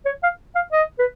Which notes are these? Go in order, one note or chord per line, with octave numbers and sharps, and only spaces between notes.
C#5
F5
F5
D#5
B4